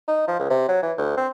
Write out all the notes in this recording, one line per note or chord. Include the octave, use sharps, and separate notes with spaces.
D#4
F3
C#2
C3
F#3
E3
D2
C4